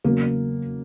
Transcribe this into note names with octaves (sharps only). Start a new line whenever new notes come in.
E2 C#3 F#3 A#3